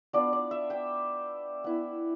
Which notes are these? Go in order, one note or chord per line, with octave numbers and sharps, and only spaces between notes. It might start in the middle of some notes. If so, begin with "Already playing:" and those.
B3 D4 F4 D5
D5
E5
G5
B3 E4